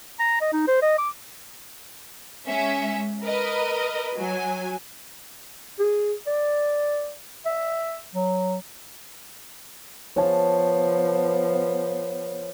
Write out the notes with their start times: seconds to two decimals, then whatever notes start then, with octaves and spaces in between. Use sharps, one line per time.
0.19 A#5
0.41 D#5
0.53 D#4
0.68 C5
0.82 D#5
0.98 D6
2.47 G#3 C#4 E5
3.23 A#4 B4 D#5
4.16 F#3 G#5
5.79 G#4
6.27 D5
7.46 E5
8.15 F#3
10.16 F3 B3 C#5 A5